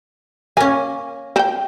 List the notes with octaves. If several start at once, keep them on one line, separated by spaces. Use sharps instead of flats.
A#3 C#4 G#5
C4 G5